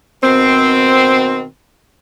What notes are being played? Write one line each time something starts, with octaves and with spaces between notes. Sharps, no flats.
B2 D#3 C4